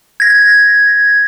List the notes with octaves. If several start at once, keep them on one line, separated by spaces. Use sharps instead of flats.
G#6 A#6